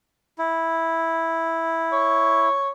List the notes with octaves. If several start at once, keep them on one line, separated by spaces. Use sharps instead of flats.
E4
C#5